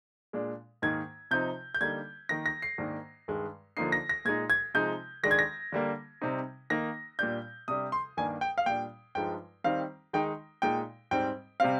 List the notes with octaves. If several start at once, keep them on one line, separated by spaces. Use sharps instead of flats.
A#2 G#3 D4
G#2 D#3 A#3 D#4 G#6
C3 F3 C4 D#4 G6
G6
D3 G3 A#3 D#4 G#6
D#3 A#3 D#4 A#6
A#6
C7
G#2 D#3 A#3 D4
G2 D#3 G#3
D3 F3 A#3 D#4 C7
A#6
A#6
A#2 G#3 D#4 G#6
G#6
C3 F3 G#3 D#4 G6
D#3 G#3 D4 A#6
G#6
A#6
D3 G3 A#3
C3 G3 C4 D#4
D#3 A#3 D#4 A#6
A#2 G3 D4 G6
C3 G3 D4 D#6
C6
G2 D#3 A#3 D4 G#5
G5
F5
A#2 G3 D4 G5
G2 F3 G#3 D#4 G5
D#3 G3 C4 D#4 F5
D#3 G#3 D#4 G5
A#2 G#3 D#4 G5
G#2 G3 C4 G5
C3 G3 C4 F5